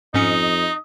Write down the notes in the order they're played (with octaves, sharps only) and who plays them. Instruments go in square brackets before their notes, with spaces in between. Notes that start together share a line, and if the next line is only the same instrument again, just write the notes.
[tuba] F2 [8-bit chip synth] G#2 C#4 C#7 [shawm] D#4 [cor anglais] D#5